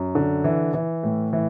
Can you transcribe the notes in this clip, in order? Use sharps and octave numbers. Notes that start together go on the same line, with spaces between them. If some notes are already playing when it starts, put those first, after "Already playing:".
Already playing: F#2
D3
E3
E3
A2
E3